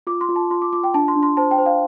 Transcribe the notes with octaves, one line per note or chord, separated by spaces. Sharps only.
F4 D6
C6
F4
A5
F4 C6
D6
F4 D6
G5
D4 A5
C6
D4
C6
C5 A5
G5
C5
F5